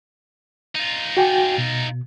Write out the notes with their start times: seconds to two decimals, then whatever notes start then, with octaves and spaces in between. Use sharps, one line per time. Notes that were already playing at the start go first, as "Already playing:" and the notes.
0.75 D#4 F4
1.17 F#4 G5 G#5
1.58 B2